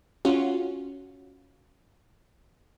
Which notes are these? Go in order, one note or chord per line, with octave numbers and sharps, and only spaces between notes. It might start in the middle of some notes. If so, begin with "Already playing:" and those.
C#4 F4 F#4